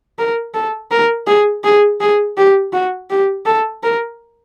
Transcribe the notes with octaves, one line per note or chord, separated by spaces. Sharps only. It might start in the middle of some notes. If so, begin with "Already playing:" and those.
A#4
A4
A#4
G#4
G#4
G#4
G4
F#4
G4
A4
A#4